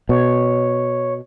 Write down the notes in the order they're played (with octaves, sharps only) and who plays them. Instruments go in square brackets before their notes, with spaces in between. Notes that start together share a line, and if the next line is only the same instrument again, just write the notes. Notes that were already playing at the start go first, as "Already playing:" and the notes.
[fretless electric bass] B2 [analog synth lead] C#5